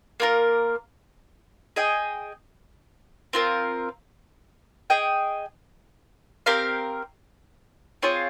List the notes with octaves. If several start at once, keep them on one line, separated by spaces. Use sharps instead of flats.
A#3 F4 A#4
G#4 D#5 G5
C4 F4 A#4
G#4 D#5 G5
C4 G4 A#4 F5
C4 F4 G#4 C#5